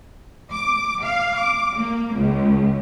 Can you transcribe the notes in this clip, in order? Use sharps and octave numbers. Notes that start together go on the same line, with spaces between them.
D6
F5
D6
A#3
C#2